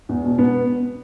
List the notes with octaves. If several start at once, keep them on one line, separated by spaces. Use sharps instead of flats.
E2
B2
B3